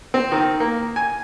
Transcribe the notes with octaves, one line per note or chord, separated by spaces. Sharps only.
C4
D#3
A#3
G#5